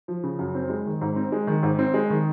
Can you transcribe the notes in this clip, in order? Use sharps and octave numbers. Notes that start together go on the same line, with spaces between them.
F3
C#3
F#2
C4
G#3
D#3
G#2
C4
G#3
D#3
G#2
C4
G#3
D#3